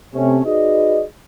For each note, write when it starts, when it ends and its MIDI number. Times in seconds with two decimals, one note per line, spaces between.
0.15 0.40 48
0.15 0.40 57
0.15 0.40 61
0.46 1.03 63
0.46 1.03 66
0.46 1.03 68
0.46 1.03 71
0.46 1.03 74
0.46 1.03 75